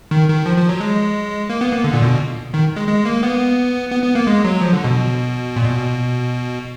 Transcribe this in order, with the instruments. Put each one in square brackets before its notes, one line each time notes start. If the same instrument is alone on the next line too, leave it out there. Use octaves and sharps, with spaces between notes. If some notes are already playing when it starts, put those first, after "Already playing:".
[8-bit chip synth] D#3
D#3
F3
F3
F#3
G#3
A#3
B3
A#3
D3
A#2
B2
D#3
G#3
G#3
A#3
B3
B3
B3
A#3
G#3
F#3
F3
D3
B2
A#2
B2